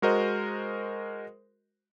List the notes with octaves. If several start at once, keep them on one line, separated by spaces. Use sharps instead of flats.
G#3 F#4 A#4 C5 D#5